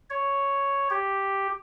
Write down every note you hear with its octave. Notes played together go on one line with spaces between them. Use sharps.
C#5
G4